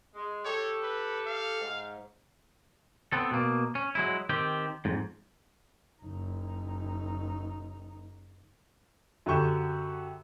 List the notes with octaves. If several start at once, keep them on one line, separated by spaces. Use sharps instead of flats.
G#3
G4 A4 C#5
B4
F5
G#2
B3 C4 A4
B2 A#3
C#4
F#3 G#3 E4
D#3 C4 G4
F2 G#2
F#1 D#4
F#2 D3 G4 C#6 G6 E7